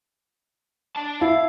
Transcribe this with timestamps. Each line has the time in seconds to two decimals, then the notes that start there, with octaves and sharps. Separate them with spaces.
0.96 D5 A5
1.21 E4 F5